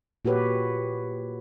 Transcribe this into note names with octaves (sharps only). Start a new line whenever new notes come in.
A#2 F#4 G4 B4 C#5